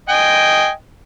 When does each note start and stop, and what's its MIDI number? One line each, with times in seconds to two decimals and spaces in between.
0.09 0.70 75
0.09 0.70 79
0.09 0.70 80